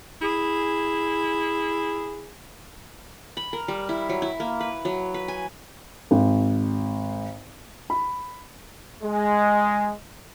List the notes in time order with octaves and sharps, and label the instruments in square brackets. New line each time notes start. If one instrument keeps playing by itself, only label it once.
[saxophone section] E4 G#4
[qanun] B5
A#4
G3
E4
F#3
E4
A#3
B4
F#3
B4
G#5
[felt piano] G#1
B5
[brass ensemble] G#3